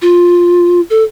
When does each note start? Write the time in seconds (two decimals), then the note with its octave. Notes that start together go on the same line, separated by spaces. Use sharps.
0.02 F4
0.90 A4